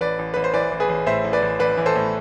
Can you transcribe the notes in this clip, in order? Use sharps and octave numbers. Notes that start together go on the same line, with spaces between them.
A1 B4 D5
A1
A1 B4
C5
E3 B4 D5
A1
G#4 B4
A1
A2 C5 E5
A1
B4 D5
A1
A1 B4 D5
E3
A4 C5
A2